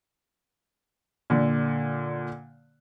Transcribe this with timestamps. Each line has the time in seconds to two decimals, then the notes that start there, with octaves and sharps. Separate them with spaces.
1.30 A#2 D3